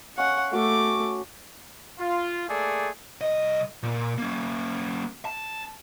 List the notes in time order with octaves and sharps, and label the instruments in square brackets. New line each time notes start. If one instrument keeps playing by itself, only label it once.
[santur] C#4 F5 [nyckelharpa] F#5
[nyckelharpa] A3 D6 [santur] F#4
[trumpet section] F4
A3 A#3 G#4 A4 D5
[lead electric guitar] C2 D#5
A#2
A#3 C#4
A5